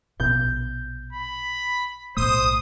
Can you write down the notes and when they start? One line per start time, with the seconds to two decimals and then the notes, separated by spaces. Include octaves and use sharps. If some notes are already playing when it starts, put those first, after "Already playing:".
0.20 A#1 B2 G6
1.13 B5
2.17 B1 A2 A3 C5 D#6